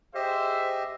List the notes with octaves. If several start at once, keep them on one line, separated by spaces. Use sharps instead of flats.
G4 G#4 C5 D#5 E5